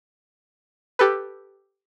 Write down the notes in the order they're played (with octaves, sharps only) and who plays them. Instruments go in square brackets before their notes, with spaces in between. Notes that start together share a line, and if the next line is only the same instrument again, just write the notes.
[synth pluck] G4 A4 B4